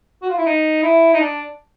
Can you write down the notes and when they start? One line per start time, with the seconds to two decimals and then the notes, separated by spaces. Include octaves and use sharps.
0.22 F#4
0.30 F4
0.38 E4
0.46 D#4
0.83 E4
1.14 D#4
1.20 D4